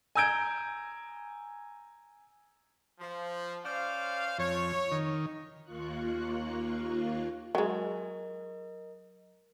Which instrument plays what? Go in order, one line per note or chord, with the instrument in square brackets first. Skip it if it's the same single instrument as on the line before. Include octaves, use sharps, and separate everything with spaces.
[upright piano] G#5 A#5 E6 G6 G#6 D7
[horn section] F3
[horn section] C#4 C5 F5 [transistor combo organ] D5
[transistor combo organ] F2 [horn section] C#5
[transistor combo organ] D#3
[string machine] D#2 A#3 F4 C#6 F#6
[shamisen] F#3 G#3 [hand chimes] A#4 D#5